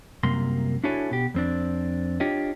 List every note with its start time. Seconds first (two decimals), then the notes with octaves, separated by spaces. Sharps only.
0.23 C2 F#2 C3 A#3 C6
0.84 D4 E4 F#4 A4 C#5 G#5
1.11 B2 G4
1.34 F2 C4 D4
2.20 D4 F4 G4 C#5 D#5